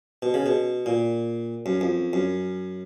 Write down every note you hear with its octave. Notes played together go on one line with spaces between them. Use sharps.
B2
C#3
B2
A#2
F#2
F2
F#2